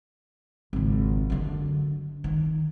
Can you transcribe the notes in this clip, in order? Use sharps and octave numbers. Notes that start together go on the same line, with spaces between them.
G#1 C#2
F#2 D3
D#3